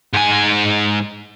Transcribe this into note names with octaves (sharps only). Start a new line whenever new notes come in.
G#2 G#5